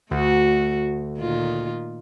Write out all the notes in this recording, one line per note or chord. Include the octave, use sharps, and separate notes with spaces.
D2 A3 F#4
A#2 D#3 F4